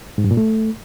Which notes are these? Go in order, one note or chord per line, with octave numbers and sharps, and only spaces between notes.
G#2
G2
A#2
A3